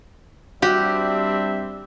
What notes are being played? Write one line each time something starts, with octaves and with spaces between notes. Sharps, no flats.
G3 C4 D4 F#4 G4 E5